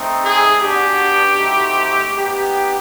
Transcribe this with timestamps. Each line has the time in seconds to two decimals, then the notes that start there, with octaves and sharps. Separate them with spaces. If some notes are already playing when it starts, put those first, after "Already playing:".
Already playing: A3 C4 D#4
0.23 G#4
0.61 B3 D4 F#4 G4
1.38 A3 C4 D#4 F#4
2.14 B3 D#4 G4